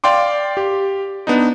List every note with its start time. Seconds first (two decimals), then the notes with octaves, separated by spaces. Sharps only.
0.04 D5 F5 G5 C6 D6
0.57 G4
1.27 B3 D4 D#4